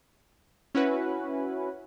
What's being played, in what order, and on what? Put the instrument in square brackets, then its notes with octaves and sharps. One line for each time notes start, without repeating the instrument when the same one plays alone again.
[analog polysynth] C#4 E4 F#4 B4